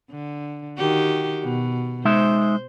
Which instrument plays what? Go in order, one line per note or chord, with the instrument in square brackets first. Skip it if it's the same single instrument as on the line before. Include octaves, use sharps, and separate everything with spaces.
[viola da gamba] D3
D#3 F#4 G4
B2
[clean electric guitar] G#3 D#4 E5 [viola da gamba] C5